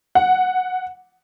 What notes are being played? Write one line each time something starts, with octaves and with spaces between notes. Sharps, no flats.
F#5